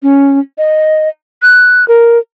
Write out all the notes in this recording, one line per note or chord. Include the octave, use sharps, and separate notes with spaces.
C#4
D#5
F#6
A#4